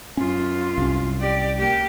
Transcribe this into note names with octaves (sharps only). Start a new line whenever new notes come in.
F#2 C#4 F4
C2 C#4
G4 D5
A#3 G4